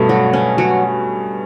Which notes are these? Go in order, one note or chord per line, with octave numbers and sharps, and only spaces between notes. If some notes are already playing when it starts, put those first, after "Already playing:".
Already playing: G2 B2 A3
F#3
C#4
F#3